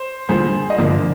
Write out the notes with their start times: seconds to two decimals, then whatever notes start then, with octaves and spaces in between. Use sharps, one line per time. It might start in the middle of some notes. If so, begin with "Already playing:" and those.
Already playing: C5
0.29 D3 G3 A#3 F4 G#4 C5
0.70 D#5
0.78 G2 D3 F3 A#3 A#4 D5